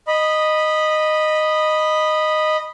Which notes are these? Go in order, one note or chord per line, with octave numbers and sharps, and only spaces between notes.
D#5 B5